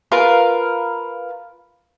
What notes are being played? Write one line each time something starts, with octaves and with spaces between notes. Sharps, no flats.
F4 A#4 B4 F5